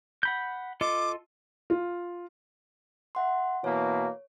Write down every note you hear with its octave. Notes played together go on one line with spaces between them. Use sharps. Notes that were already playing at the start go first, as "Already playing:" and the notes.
F#5 B5 G6
F4 A4 D#5 D6
F4
E5 F#5 C6
B2 E3 A#3 C#5